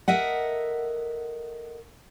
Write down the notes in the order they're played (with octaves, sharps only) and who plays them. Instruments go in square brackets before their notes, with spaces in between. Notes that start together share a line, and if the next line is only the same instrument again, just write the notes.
[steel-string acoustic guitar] A4 A#4 D#5 E5 F#5